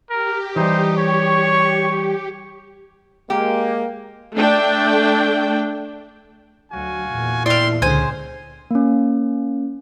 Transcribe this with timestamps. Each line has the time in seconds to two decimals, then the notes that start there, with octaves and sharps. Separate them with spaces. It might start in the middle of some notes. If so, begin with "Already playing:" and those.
0.10 G4 A#4
0.56 E3 G3 D#4 C5
0.97 C#5 C#6
3.30 G#3 A#3 G4
4.35 A3 D4 G5
6.72 D2 F#3 F#4 F5 G#5
7.07 E2 A#2
7.46 D4 E4 D5 E5 F5 G5 C6 D6
7.82 C#2 D3 G#3 C#4 G#4 C5 G#5
8.71 A#3 C#4